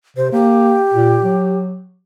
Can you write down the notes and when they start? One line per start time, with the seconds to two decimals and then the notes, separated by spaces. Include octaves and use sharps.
0.17 C3 C5
0.32 A#3 G4
0.94 A#2
1.24 F#3